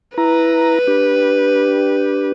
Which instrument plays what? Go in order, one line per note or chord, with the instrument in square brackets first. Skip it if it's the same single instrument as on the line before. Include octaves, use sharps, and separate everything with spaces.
[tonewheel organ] E4 A#5 [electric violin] B4
[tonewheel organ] D4 G4